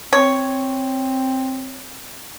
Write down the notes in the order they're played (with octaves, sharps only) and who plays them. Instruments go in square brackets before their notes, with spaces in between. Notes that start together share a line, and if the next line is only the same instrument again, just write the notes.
[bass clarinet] C4 [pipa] C#5